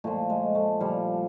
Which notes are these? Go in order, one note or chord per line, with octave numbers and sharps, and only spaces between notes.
A#2 F3 A3
G#3
A3
A#2 F3 G3